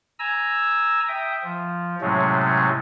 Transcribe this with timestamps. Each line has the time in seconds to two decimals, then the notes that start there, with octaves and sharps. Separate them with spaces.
0.19 G#5 A#5 E6
1.08 E5 G5 D#6
1.43 F3
2.01 A2 C3 F#3 G#3 A3 C#4